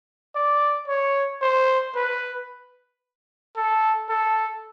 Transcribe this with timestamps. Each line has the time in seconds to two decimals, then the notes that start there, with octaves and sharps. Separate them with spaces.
0.35 D5
0.88 C#5
1.42 C5
1.95 B4
3.57 A4
4.09 A4